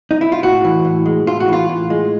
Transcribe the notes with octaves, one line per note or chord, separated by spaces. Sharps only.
D#4
E4
F4
A2 F#4
E3
A2
G#3
A2 F4
F#4
E3 F4
A2
G#3